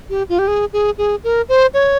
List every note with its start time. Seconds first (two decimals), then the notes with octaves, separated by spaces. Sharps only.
0.10 G4
0.29 F4
0.39 G4
0.48 G#4
0.73 G#4
0.98 G#4
1.24 A#4
1.49 C5
1.74 C#5